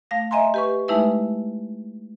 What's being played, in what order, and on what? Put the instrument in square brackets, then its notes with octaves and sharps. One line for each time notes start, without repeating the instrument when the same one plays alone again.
[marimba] A3 F5 A#6
D#5 E5 G#5 A#5 C6
G4 B4 C#6
G#3 A3 D#4 E4 B4 E5